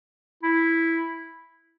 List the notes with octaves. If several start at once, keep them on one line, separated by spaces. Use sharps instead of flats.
E4